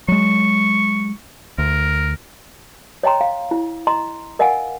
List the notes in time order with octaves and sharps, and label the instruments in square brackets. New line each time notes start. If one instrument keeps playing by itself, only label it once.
[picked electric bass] F#3 G#3 [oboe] C#6
[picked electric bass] D2 [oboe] A#4
[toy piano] C#5 D#5 G5 A#5 C6
F5
E4
D#5 A#5 C6
A#4 D#5 F5 F#5 G#5